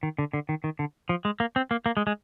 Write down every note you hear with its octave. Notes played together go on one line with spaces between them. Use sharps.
D#3
D3
D3
D#3
D#3
D3
F3
G#3
A#3
C4
A#3
A#3
G#3
G#3